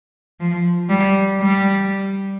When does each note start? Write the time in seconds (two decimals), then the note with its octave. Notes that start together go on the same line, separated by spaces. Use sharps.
0.40 F3
0.90 G3
1.41 G3